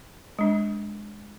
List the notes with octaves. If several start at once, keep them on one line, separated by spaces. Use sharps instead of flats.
G#3 D4